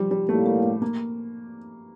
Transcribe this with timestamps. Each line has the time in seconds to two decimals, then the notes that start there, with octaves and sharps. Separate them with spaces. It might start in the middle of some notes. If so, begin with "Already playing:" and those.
Already playing: F3 G3
0.11 G3
0.29 A2 G3 A3 A#3
0.46 A3
0.64 A3
0.82 A#3